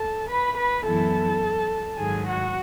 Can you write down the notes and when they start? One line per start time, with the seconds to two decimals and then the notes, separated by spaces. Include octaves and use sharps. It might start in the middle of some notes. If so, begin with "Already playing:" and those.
Already playing: A4 A5
0.28 B4 B5
0.56 B4 B5
0.85 F#2 E3 B3 E4 A4 A5
1.98 G#2 D#3 F#3 G#4 G#5
2.26 F#4 F#5